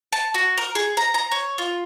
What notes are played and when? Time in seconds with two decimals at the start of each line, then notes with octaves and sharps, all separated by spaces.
0.12 A5
0.34 F#4
0.58 A#4
0.75 G#4
0.97 A#5
1.14 A#5
1.31 C#5
1.58 F4